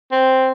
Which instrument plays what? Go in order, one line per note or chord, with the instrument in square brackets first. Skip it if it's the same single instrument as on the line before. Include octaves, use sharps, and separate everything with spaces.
[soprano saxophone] C4